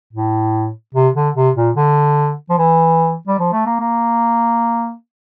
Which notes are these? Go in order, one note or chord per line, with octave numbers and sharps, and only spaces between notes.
A2
C3
D3
C3
A#2
D3
F3
E3
G3
F3
A3
A#3
A#3